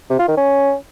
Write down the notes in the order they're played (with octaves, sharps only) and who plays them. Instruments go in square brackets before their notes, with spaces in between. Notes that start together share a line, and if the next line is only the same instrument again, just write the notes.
[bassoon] C3
F4
D#3
C#4